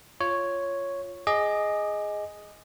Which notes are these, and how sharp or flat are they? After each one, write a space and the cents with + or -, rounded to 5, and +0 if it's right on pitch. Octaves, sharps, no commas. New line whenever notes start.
F4 -5 C#5 +0
G#4 +0 D#5 +0 D6 +25